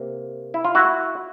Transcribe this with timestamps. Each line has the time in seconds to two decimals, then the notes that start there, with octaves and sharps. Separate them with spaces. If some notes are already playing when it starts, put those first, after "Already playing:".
Already playing: C3 A#3
0.54 E4
0.65 F4
0.75 E4 F#4